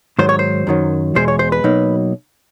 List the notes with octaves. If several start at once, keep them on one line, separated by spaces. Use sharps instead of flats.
G#2 D#3 F#3 C5
C#5
C5
F#2 D#3 F#3
E2 B2 G#3 C5
C#5
C5
B4
B2 F#3 A#3 D#4